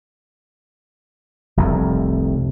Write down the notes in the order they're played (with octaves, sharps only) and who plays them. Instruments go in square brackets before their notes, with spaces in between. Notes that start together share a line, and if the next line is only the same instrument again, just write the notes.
[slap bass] F1 C2 F2